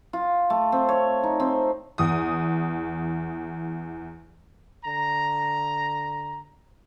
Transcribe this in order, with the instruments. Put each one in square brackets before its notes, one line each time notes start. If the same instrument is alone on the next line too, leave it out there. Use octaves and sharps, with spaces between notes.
[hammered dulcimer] F4
A3
C4
C#5
D#4
C4
[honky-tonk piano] E2 D#6
[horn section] D3 A#5